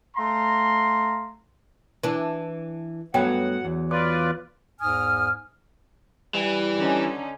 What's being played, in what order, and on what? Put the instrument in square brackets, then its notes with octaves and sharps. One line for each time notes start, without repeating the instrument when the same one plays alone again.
[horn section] A3 F5 A#5 C6
[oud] E3 D4
[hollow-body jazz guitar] G2 A3 B3 [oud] F#3 [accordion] F#5 [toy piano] G5
[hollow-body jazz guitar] E2
[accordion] F4 B4 D5 [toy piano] D6
[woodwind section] E2 G#2 G#5 D#6 F6
[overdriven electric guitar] E3 [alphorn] G3
[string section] D3 C#4 D#4